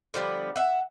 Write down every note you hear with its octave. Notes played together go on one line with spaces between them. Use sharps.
D3 F3 G3 B3
E5 F#5